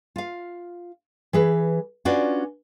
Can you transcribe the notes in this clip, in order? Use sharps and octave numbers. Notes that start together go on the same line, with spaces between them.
F4 F5
E3 G#4 B4
C#4 D4 F4 F#4 B4 D5